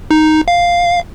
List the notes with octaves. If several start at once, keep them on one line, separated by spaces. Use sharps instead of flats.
D#4
F5